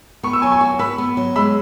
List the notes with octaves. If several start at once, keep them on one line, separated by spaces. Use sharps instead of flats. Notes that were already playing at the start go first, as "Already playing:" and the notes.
B3 C#6
E6
F#3 G#5 C#6
G#5 C#6
F#4
B4 B5 E6
B3
F#3
G#3 B5 E6